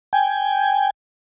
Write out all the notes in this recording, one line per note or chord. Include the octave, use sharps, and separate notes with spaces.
G5 G#5